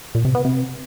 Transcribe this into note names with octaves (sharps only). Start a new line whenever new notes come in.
A#2
C3
B3
C3